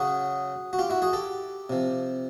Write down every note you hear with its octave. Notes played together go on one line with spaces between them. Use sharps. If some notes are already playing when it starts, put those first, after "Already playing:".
Already playing: C#3 F#3 F#4 G#4
F#4
F4 G4
E4 F#4
F#4 G#4
G4 A4
C3 F3